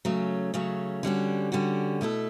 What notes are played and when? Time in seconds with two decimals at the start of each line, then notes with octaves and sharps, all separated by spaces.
0.05 C#3 F#3 A3 C#4
0.54 C#3 F#3 A3 C#4
1.03 D3 G3 C#4 F#4
1.52 D3 G3 C#4 F#4
2.01 B2 A3 E4 A4